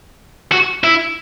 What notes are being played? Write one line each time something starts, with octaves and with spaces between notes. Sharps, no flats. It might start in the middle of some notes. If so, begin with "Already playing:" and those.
F#4
E4